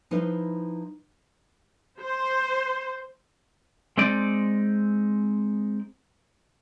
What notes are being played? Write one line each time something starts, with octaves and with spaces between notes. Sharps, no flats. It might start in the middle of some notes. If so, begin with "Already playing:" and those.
F3 D#4 E4 B4 C5 E5
C5
G#3 C4 D#4 D5